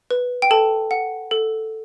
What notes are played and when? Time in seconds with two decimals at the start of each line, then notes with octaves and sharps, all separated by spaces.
0.11 B4
0.42 G5
0.51 A4 A5
0.91 F#5
1.31 A4